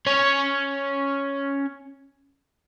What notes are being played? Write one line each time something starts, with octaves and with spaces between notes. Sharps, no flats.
C#4 C#5